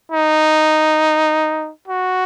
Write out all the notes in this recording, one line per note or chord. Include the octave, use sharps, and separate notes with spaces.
D#4
F#4